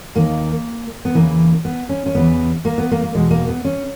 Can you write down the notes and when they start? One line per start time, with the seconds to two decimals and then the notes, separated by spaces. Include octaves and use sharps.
0.15 D#2 D#3 A#3
1.05 B3
1.15 E2 C#3 E3 A#3
1.65 B3
1.89 C#4
2.06 C#4
2.15 E2 C#3 E3 B3
2.65 A#3
2.78 B3
2.91 A#3
3.03 A#3
3.15 E2 B2 G#3
3.31 A#3
3.48 B3
3.65 C#4